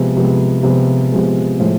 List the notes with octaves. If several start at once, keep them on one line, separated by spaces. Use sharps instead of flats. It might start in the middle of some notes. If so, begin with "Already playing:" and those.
Already playing: C3 F3 G#3 B3
C3 F3 G#3 B3
C3 F3 G#3 B3
C3 F3 G#3 B3
A2 F3 G#3